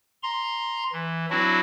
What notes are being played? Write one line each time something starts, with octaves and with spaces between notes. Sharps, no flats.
A#5 C6
E3
F#3 C4 D4 E4 F#4